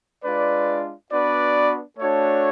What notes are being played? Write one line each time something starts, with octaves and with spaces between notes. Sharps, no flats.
G#3 D4 F4 B4 D5
B3 D4 F#4 B4 D5
A3 D4 F#4 A4 C#5